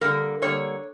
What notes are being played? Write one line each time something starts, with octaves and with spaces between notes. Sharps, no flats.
D3 G3 A#3 A#4
D3 G3 A#3 C#5